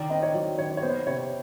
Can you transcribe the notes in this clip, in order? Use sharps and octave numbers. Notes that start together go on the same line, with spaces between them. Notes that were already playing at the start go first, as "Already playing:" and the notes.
Already playing: D#3 D5
C4 D#5
C#5
F#3 D5
D#3 C#5
C#5
B3 C5
C3 C#5